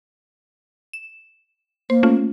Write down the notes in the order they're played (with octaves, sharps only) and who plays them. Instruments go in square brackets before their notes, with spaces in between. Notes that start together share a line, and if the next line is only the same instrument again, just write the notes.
[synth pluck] E7
[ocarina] A#3 [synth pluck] C5
[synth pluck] A3 C#4 F4